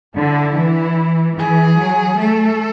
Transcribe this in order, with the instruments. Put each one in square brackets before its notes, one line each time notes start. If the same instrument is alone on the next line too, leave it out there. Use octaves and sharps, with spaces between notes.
[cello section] D3 [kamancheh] E4
[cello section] E3
[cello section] E3 [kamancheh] G#4
[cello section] F#3
[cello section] A3 [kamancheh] A4